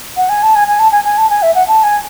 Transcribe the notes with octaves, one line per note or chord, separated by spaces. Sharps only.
F#5
G#5
A5
G#5
G#5
A5
G#5
G#5
A5
G#5
E5
F#5
A5
G#5